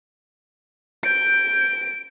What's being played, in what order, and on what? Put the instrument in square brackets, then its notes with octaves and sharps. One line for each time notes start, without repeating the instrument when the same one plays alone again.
[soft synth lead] G6 [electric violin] D7